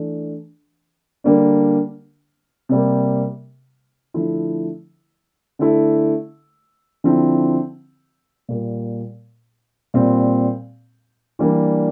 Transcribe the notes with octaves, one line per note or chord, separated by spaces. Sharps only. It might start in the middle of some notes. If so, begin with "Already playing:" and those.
Already playing: E3 A3 D4
D3 G3 A#3 D4
C3 G3 A#3
D3 F3 A3 E4
D3 A3 E4
D3 F3 C4 E4
A#2 G3 A#3
A#2 G3 C4
E3 G3 A#3 D4